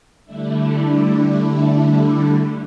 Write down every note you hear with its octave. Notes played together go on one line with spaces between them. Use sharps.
D3 G3 A3 D4 E4